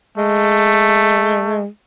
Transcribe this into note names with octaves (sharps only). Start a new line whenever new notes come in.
G#3 A3